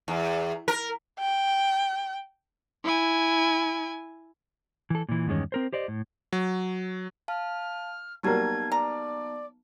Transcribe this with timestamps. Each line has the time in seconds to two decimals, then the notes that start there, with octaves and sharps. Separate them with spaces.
0.08 E2
0.68 A#4
1.20 G5
2.84 E4 G#5
4.90 E3 A4
5.09 A#2 E3
5.27 E2 G2 D#3 G#3 C#4
5.52 C4 A#4 C5
5.73 G4 C5 D5 D#5
5.88 A2
6.33 F#3
7.28 F5 A5 F6
8.23 F#3 G3 A#3 B3 D#4 A5 G#6
8.72 D5 A#5